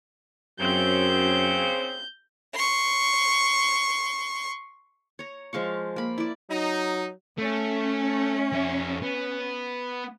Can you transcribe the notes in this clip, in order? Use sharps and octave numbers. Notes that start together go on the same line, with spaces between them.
F#2 C#3 C4 G6
C6 C#6
C#5 A#5
F3 G#3 F5 C#6
A#3 B5
E4 D5
F#3 D#4
A3 C#4
F2 E5
B3